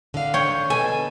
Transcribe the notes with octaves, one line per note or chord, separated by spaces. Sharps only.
D3 F5
C#5 G5
B2 A4 G#5